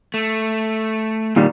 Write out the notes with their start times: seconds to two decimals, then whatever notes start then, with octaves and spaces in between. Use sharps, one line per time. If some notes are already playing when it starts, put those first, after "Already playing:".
0.14 A3
1.36 A#2 D#3 G3